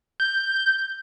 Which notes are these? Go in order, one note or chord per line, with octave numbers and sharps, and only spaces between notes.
G6